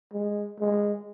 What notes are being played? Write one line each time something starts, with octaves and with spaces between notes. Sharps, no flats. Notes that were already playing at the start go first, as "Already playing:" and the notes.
G#3
G#3